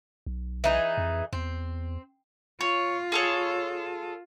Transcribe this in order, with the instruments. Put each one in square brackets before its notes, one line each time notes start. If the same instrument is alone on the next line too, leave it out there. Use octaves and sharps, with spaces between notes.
[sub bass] B1
[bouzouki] E3 D#4 G#4
[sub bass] F2
[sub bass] E2 [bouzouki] C4
[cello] F4 [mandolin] C#5
[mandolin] G#4 A4 C#5